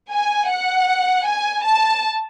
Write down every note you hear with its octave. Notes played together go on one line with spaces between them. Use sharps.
G#5
F#5
G#5
A5